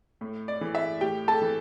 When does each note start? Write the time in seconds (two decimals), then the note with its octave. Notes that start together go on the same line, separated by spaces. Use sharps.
0.21 A2
0.48 D5
0.61 E3
0.75 E5
1.01 A2 G4 G5
1.28 A4 A5
1.42 E3